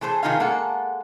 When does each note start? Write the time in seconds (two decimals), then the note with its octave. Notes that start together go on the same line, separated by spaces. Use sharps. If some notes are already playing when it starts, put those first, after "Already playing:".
0.01 E3 A3 G#4 C5
0.23 D#3 E3 D#4 F4 G#4 F5
0.40 G#3 A#3 F#4 A4 F#5